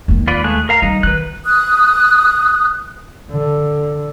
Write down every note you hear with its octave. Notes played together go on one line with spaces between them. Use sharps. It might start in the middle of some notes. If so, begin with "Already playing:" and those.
D#2 G#3
F4 B4 D5
A3 G#4 F#6
A#4 F5 A#5
G3 D#4
D#3 B4 F#6
D#6 F#6
D3